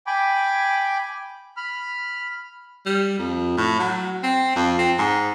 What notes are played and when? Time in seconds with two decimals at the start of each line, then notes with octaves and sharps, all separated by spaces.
0.07 G5 G#5 B5 D6
1.57 B5 F6
2.86 G3
3.19 F2
3.57 A2
3.79 F#3
4.23 C4
4.56 F2
4.79 C4
4.99 G#2